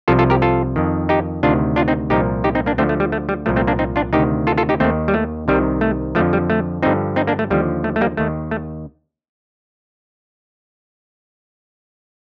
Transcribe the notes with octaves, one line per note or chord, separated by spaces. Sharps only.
C2 C3 F3 F4 A4
F4 A4
G4 A#4
F4 A4
F2 D#3
D#4 G4
D2 C3 D#3 D4 F4
D4 F4
C4 D#4
C2 A#2 F3 D#4 G4
D#4 G4
C4 D#4
A#3 D4
D2 D3 F3 A3 C4
A3
G3
A3
G3
C2 A#2 F3 A3
A3 C4
A#3 D4
C4 D#4
D4 F4
D2 C3 D#3 D#4 G4
F4 A4
F4 A4
D#4 G4
D#2 D#3 A3 C4
G3
A3
C2 C3 D#3 G3
A3
F2 D3 F3 A3
G3
A3
G2 D3 F3 C4 D#4
C4 D#4
A#3 D4
A3
D#2 D3 F3 G3
A3
A3
G3 A#3
D#2 D#3 A3
A3